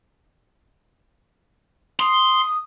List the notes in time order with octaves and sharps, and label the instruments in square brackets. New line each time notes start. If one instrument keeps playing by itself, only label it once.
[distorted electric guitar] C6 [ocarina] D#6